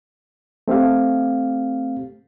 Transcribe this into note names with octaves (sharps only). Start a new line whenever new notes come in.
A3 C4 G4 F5